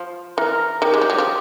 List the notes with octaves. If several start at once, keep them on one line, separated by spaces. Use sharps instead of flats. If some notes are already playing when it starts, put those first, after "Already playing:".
Already playing: F3
E3 A#4
D#3 G4
G#3
G3
F#3
F3